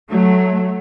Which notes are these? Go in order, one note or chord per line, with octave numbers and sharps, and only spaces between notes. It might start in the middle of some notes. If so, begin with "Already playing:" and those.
F#3 A3